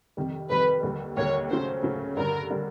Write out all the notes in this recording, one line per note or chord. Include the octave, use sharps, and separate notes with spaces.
F2 C3 D#3 G3
F2 C3 D#3 G3 B4
D#2 D3 G3
D#2 D3 G3 C#5
C#3 F#3 A3 C#4 C5
C#3 F#3 A3 C#4
G2 D3 G3 A#4
D3 G3